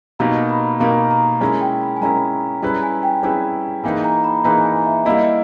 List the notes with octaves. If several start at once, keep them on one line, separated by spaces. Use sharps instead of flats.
B2 A#3 D#4 G4 A#4 A#5
B5
B2 A#3 D#4 G4 A#4 A#5
A#5
G#3 C#4 E4 A#4 G#5
G5
B5
G#5
G#3 C#4 E4 A#4 A#5
G3 C#4 E4 G#4 B4 A#5
G#5
G5
G3 C#4 E4 G#4 B4
E3 A#3 D#4 G#4 B4 G#5
A#5
B5
E3 A#3 D#4 G#4 B4 A#5
G#5
E5
G3 A#3 E4 D#5